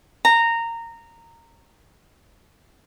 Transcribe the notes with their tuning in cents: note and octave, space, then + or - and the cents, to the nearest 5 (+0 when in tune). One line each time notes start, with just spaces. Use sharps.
A#5 -15